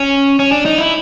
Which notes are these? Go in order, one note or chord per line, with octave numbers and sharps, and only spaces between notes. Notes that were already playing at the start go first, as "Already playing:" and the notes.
Already playing: C#4
C#4
D4
D#4
E4